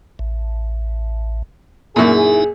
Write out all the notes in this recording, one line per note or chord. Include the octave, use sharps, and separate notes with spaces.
A1
F#2 A#2 D#4 E4 G#4 E5